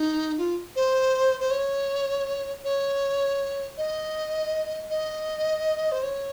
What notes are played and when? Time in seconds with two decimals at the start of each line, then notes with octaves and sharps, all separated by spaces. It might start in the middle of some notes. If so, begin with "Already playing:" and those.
Already playing: D#4
0.38 F4
0.76 C5
1.40 C5
1.51 C#5
2.64 C#5
3.78 D#5
4.90 D#5
5.92 C5
6.03 C#5